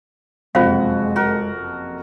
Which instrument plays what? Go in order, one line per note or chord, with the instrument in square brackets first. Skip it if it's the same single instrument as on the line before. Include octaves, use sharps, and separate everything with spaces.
[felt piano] F#1 F2 C3 [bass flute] G#3 [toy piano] F4 C5 F5 [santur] F#4
[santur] F#4 A#4